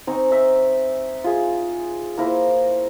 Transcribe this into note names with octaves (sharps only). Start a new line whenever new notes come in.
C4 D#4 G#5 C#6
D#4 E5
F4 G#4
A#3 E4 A#4 C5